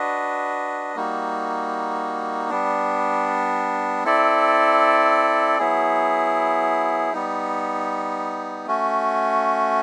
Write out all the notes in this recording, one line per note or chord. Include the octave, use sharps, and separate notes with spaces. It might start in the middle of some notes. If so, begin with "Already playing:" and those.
Already playing: D4 F#4 B4 D#5
G3 A#3 D#4 F#4
G3 B3 D4
C4 E4 A4 D5
F#3 B3 E4 G#4
G3 B3 D#4
A3 C#4 F#4